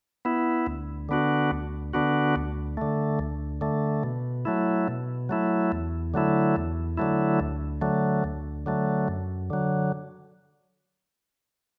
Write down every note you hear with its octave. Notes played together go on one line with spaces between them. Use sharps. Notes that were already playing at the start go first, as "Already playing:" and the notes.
B3 E4
D2
D3 B3 D4 F#4
D2
D3 B3 D4 F#4
D2
D3 A3
D2
D3 A3
B2
F#3 A3 E4
B2
F#3 A3 E4
E2
D3 F#3 A3 E4
E2
D3 F#3 A3 E4
D2
D3 F#3 A3
D2
D3 F#3 A3
F#2
D3 F#3